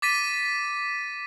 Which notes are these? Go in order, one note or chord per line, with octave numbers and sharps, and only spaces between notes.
D6 A6 B6 D#7